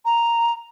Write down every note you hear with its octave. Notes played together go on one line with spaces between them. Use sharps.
A#5